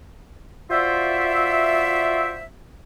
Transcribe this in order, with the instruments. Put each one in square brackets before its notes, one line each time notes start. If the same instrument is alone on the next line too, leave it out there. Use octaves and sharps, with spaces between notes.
[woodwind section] F4 F#4 C5 D5 E5